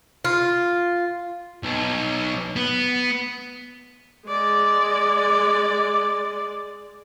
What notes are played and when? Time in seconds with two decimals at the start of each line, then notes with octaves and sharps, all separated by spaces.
0.25 F4
1.63 B1
2.56 B3
4.27 G#3 D5